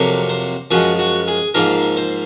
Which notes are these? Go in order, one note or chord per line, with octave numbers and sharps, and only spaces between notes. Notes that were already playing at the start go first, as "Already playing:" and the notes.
Already playing: F2 C3 F#3 A#3
C5
F#2 F3 G#3 F#4
F#4
G#4
G#2 F3 A#3 A#4
C5